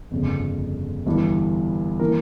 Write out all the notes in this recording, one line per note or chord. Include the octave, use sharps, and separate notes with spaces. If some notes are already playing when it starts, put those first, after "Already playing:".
G1 F2 C#3
G1 G2 E3
E3 A#3 E4 A#4